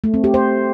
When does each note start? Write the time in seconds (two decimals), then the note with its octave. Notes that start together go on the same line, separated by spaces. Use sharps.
0.04 A3
0.14 C4
0.24 G4
0.34 C5